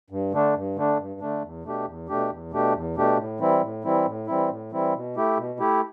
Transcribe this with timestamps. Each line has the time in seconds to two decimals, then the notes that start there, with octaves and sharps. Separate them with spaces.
0.10 G2
0.32 D3 A3 D4
0.55 G2
0.76 D3 A3 D4
0.98 G2
1.20 D3 A3 D4
1.42 E2
1.64 B2 A3 D4 G4
1.86 E2
2.09 B2 A3 D4 G4
2.30 E2
2.51 B2 A3 D4 G4
2.74 E2
2.96 B2 A3 D4 G4
3.17 A2
3.40 E3 G3 C4 E4
3.61 A2
3.84 E3 G3 C4 E4
4.05 A2
4.27 E3 G3 C4 E4
4.49 A2
4.72 E3 G3 C4 E4
4.94 B2
5.16 A3 E4 G4
5.37 B2
5.60 A3 E4 G4